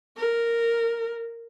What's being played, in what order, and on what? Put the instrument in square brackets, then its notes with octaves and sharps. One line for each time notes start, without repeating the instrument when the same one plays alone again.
[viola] A#4